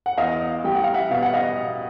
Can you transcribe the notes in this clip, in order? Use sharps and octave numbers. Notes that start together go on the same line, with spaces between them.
F#5
E2 D#5 F5
G3 G5
F#5
F5
E5 F#5
B2 F5
F#5
D#5 F5